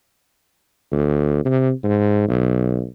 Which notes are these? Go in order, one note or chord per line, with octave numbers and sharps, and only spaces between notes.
D2
C3
G#2
B1